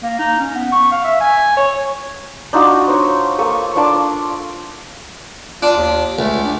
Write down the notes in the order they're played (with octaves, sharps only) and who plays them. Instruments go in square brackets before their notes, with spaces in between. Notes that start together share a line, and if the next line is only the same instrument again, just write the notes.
[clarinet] A#3
D#4
C#4
B3
C#6
F5
E5
G#5
C#5
[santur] D4 D#4 F4 F#4
C5 C#5
A#3 A4 C#6 D#6
D4 F4 D5 A5
[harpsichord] D4 [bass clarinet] F4
[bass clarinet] D#2
[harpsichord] C#2 [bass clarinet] A3
[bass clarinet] D4